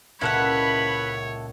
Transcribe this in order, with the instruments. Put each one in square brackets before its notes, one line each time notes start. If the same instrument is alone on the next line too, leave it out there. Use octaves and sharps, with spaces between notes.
[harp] C#2 A#2 [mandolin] E4 A4 F#5 [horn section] B4 B5 [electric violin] C#5